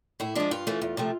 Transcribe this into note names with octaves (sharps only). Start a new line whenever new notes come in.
A2 E4
F3 G#3 D4
G2 F4
E3 A3 C#4
E2
C3 F3 A3